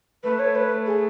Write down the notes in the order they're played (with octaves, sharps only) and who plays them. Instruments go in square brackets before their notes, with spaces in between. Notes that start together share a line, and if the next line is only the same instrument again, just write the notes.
[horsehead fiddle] A3 [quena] B4
[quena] C#5
B4
G#4